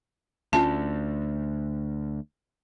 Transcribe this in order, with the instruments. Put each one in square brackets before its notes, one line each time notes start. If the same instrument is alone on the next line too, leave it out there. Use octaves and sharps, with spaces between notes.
[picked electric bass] D2 [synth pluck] A3 C#4 F4 [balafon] A5